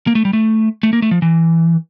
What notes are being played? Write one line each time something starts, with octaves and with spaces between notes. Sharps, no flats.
A#3
A3
G3
A3
A3
A#3
A3
F3
E3